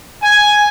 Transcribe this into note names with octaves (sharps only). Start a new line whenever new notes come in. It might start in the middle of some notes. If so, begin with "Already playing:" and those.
G#5